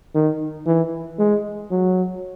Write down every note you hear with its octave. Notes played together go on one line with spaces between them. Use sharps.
D#3
E3
G#3
F#3